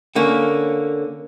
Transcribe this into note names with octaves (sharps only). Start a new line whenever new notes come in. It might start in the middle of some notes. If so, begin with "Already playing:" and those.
D3 A#3 C#4